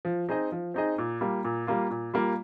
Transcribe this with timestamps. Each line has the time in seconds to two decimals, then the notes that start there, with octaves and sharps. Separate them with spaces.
0.05 F3
0.29 C4 D#4 G#4 D#5
0.52 F3
0.74 C4 D#4 G#4 D#5
0.98 A#2
1.21 G3 A#3 F4
1.45 A#2
1.67 G3 A#3 F4
1.91 A#2
2.14 G3 A#3 F4